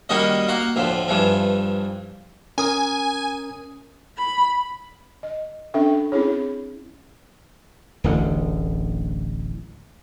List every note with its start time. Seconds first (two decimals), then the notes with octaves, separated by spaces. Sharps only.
0.09 D#3 G3 A#3 C#4 F#4 D#5
0.48 A#3 F#4 A#5
0.76 D2 A2 F3
1.08 G2 E3 F3
2.58 C#4 A#4 G#5 D#6
4.18 B5
5.23 D#5
5.74 C#4 D4 A4 E5 G5
6.12 C4 C#4 E4 G#4 C#5
8.04 D1 A1 D3